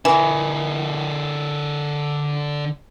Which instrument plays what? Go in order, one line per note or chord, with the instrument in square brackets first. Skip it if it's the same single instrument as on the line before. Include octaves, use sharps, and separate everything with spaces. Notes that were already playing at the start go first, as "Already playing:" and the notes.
[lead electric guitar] D3 A#4 [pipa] E3